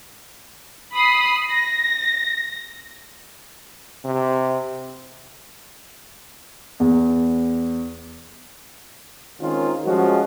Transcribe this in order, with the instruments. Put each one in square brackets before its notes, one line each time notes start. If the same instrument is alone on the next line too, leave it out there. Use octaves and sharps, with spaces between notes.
[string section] B5 D#6 C7
A#6
[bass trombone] C3
[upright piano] E2
[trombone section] D#3 G#3 C4 C#4 F4 A#4
F3 G3 G#3 C#4 F#4